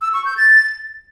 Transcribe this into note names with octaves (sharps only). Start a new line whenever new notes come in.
E6
C#6
G6
A6